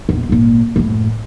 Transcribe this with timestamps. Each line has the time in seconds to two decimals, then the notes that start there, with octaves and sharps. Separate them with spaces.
0.09 A#1 E2
0.29 G#1 A#2
0.76 F#2 A2